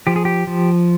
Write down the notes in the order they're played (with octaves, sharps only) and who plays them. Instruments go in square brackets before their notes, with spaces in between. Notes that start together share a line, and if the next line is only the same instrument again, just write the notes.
[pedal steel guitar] F3 G4
G#4
G4
F3